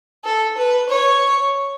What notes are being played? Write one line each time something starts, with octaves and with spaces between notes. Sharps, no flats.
A4
B4
C#5